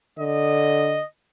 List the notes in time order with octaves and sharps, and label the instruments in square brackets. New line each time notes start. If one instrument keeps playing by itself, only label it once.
[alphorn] D3 [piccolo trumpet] D#5